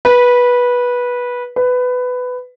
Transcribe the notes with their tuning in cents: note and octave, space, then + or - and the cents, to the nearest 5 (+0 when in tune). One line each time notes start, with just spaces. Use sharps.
B4 -15
B4 +15